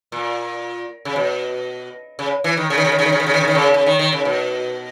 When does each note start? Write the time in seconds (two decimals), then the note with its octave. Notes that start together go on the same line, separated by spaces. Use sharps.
0.12 A#2
1.05 C#3
1.16 B2
2.19 C#3
2.44 E3
2.57 D#3
2.70 C#3
2.78 D#3
2.85 C#3
2.92 D#3
2.99 C#3
3.06 D#3
3.12 C#3
3.20 D#3
3.26 C#3
3.34 D#3
3.41 C#3
3.48 D#3
3.55 C#3
3.74 C#3
3.86 D#3
3.99 D#3
4.12 C#3
4.25 B2